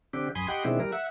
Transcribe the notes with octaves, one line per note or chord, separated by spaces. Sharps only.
D3 C4 D4 G4
F#2 G#5 B5 C6 D#6
G4 D#5 F#5 G5 B5 C6
B2 D#3 G#3 C4 D4 E4
G3 A#4
E5 F#5